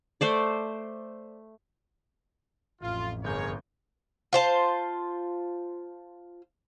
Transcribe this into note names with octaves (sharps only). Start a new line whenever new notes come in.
A3 C5 D5
A1 F2 F4
G1 G#4 A#4 C#5 G6
F4 C5 A5